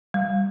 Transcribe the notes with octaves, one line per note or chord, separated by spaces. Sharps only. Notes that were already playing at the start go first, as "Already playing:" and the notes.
G3